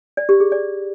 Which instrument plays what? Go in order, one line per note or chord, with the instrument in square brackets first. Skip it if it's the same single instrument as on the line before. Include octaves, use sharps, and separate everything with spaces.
[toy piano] D5
G4
G#4
D5